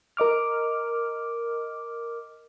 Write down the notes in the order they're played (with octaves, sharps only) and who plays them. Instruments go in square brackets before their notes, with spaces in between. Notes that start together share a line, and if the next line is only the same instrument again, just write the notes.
[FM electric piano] A#4 D#5 D6 F6